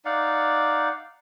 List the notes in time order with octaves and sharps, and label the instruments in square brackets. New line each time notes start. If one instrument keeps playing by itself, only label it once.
[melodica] D#4 D5 F5 F#5